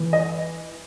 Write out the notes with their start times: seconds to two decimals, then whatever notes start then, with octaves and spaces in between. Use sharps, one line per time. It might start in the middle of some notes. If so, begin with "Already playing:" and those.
Already playing: E3
0.13 D#5